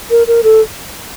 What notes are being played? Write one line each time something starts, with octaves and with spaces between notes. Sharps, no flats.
A#4
A#4
A4